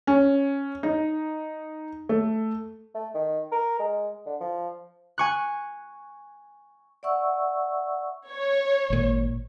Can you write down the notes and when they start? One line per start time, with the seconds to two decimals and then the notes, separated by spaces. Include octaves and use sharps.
0.07 C#4
0.83 D#4
2.09 A3
2.95 A3
3.15 D#3
3.52 A#4
3.79 G#3
4.26 D3
4.41 F3
5.18 G#5 C#6 F#6
7.03 D5 E5 F#5 C#6 E6
8.32 C#5
8.90 G#1 A#2